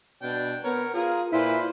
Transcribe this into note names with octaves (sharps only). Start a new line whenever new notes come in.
B2 D4 G5
B3 A#4 C#5
F4 G#4 A#4
A#2 E4 F4 B4 C5